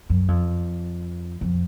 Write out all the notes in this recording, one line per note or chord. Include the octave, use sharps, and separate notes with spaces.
F#2
F2
F2